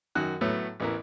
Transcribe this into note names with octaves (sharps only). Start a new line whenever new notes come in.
F#2 D#3 F#4 F#6
A2 F#3 A3 B3
A1 B3 E4 A#4